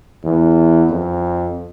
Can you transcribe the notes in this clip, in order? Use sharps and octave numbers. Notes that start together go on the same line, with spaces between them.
E2
F2